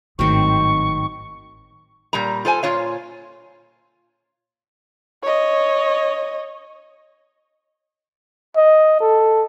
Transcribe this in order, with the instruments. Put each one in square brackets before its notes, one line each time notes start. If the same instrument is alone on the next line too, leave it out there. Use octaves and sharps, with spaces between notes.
[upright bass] G#1 A2 [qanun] D#3 F#3 C4 [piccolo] C#6
[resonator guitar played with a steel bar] A#2 G3 A#5
F4 A4 C5 G#5
A#2 F4 C#5 F5
[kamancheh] C#5 D#5
[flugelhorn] D#5
A4